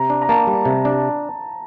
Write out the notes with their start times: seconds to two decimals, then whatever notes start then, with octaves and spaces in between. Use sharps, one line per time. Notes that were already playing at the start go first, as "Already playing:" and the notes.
Already playing: C3 A#5
0.10 D4
0.22 A#5
0.29 A#3 A5
0.47 G3
0.65 C3
0.85 D4